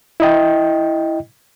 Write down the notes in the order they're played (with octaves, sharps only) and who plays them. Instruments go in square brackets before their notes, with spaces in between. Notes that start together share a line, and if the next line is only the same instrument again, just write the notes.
[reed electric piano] E4 D#5 G5